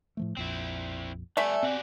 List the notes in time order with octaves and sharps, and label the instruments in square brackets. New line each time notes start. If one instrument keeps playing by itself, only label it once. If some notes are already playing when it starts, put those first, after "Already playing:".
[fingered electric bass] A2 F3 A3
[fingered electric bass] A#1 F2 [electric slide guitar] C4 E4
[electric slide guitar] G3 B3 [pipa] A3 E5 [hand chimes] D5 G#5
[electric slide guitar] B2 F#4 G4 [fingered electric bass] C4